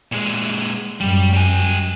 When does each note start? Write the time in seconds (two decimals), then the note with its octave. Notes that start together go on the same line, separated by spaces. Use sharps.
0.12 A#2 G#3
1.00 F#2 G3
1.33 G3 G#5